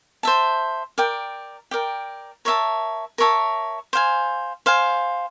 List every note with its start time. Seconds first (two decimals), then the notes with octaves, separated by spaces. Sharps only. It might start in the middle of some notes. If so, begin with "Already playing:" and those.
0.23 C5 E5 A5
0.98 A#4 D5 G5
1.71 A#4 D5 G5
2.45 A#4 C#5 E5 A5
3.18 A#4 C#5 E5 A5
3.93 C5 F5 G#5
4.66 C5 F5 G#5